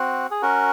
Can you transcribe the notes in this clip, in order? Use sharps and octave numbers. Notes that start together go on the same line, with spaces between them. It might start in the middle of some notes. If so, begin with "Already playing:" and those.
Already playing: C4 F#4
G#4
C#4 F#4 A#4